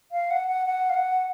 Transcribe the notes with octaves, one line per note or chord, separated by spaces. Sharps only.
F5
F#5
F#5
F#5
F5
F#5